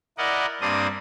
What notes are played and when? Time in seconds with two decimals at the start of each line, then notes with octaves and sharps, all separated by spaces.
0.18 E4 A#4 D5 D#5 F#5
0.61 G2 A#3 C4 D4 D#6